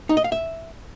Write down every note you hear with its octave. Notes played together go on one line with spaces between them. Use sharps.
D#4
D#5
F5
E5